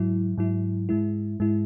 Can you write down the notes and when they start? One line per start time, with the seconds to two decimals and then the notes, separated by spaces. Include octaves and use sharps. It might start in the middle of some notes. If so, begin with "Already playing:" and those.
Already playing: G#2 F#3 E4
0.37 G#2 F#3 E4
0.89 G#2 G#3 E4
1.40 G#2 G#3 E4